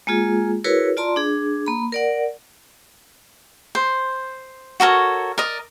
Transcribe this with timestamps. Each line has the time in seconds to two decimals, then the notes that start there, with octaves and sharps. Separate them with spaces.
0.07 G#3 A#3 F4 G#4
0.64 E4 F#4 G#4 A#4 B4 C#5
0.97 F4 D5 A5 A#5 C6
1.16 D4 G#4
1.66 A#3 B5
1.92 A#4 D5 F#5
3.75 C5
4.80 F#4 A4 A#4 C#5
5.38 A#4 D5 D#5